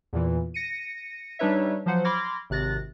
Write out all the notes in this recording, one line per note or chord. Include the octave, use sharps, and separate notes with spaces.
E2 A#2 E3
A#6 C#7 D#7
G3 D4 D#4 B4 C#5 E5
F3 F#3 C5 F#5
B5 C6 D6 F6 G#6 A#6
G#1 C3 F#6 A6 A#6